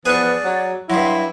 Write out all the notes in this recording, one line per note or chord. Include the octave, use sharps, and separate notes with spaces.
E2 F3 B3 G#4 D5 C#6
F#3
G2 F#3 E4 C6